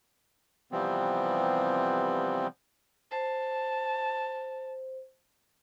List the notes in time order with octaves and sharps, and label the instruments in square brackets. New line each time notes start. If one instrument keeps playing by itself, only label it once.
[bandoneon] C3 E3 F3 G3 B3 C4
[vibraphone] C5 [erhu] A5